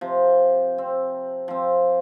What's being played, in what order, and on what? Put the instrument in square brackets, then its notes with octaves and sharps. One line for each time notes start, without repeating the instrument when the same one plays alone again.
[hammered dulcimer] C3 F3
C4
F3 C4